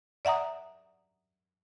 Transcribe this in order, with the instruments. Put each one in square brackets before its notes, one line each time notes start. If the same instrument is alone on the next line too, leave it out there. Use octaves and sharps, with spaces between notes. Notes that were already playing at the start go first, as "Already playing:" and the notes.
[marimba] D5 E5 F#5 A#5 D#6